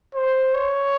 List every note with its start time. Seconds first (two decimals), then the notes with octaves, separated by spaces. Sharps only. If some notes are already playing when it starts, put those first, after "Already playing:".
0.15 C5
0.54 C#5